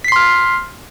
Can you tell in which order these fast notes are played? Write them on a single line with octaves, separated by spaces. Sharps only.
B6 C7 C6 F6